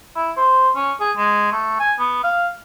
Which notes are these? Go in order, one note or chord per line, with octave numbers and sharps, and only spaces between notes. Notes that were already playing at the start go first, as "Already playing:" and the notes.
E4
C5
C#4
G#4
G#3
A3
G#5
B3
F5